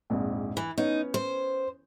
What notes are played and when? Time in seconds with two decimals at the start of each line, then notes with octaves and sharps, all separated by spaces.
0.10 A#1 F2 G#2
0.57 E3
0.78 B3 C#4 D#4 C#5
1.14 C5